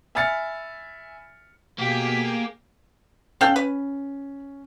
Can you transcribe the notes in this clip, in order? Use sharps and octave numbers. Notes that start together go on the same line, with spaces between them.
E5 G#5 B5 F6 A6 C#7
B2 A#3 G4 G#4 B6
C#4 A4 F5 G5
B4